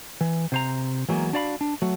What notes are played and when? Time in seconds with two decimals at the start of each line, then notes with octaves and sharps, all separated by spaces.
0.21 E3
0.52 C3 C5 A#5
1.09 E3 F#3 G#3 A#3 B3
1.33 D4 F#4 D5 F5 B5
1.61 D4
1.82 F#3 A3 F#4